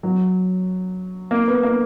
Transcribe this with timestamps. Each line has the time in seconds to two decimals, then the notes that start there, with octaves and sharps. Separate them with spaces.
0.03 F#3
1.31 A#3
1.48 B3
1.63 A#3